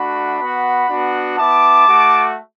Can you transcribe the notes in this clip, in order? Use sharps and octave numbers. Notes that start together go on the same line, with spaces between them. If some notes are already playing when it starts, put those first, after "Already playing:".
Already playing: A3 D4 F#4 F#5 B5
B3 F#4
B3 D4 F#4
B3 E4 A5 D6
A3 F#4